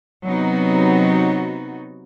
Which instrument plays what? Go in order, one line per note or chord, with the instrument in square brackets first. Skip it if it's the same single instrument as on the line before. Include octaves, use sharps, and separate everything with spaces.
[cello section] C3 F#3 B3 D#4 F#4